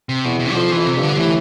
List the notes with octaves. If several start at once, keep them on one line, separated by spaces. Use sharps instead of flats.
C3
E2 B2
B2
G3
F2 F3
F2 E3
C3
G2
D3
A2 E3